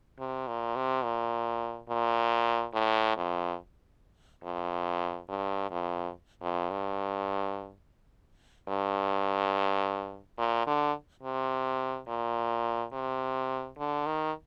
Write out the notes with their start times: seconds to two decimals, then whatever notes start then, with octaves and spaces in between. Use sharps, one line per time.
0.19 C3
0.48 A#2
0.76 C3
1.04 A#2
1.89 A#2
2.74 A2
3.17 F2
4.44 F2
5.29 G2
5.71 F2
6.41 F2
6.70 G2
8.69 G2
10.38 A#2
10.67 D3
11.23 C3
12.08 A#2
12.93 C3
13.78 D3
14.06 D#3